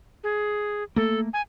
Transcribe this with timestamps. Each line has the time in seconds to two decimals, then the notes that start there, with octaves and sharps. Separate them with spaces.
0.24 G#4
0.96 A3 A#3 A4
1.33 G#5